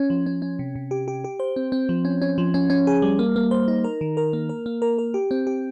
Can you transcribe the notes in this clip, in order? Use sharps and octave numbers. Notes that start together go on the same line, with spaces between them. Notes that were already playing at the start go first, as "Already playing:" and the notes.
Already playing: C#4
F3
C#4
C#4
C3
C3
G4
G4
G4
C5
C4
C4
F3
C#4
C#4
F3
C#4
C#4
G#4
G3
A#3
A#3
C5
D#4
A#4
D#3
A#4
A#3
A#4
A#3
A#4
A#4
G4
C4
G4